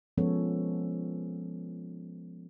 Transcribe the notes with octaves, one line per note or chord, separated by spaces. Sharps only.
F3 G#3 B3 C#4 A4 C#5